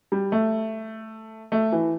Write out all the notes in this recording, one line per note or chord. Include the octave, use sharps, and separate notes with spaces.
G3
A3
A3
E3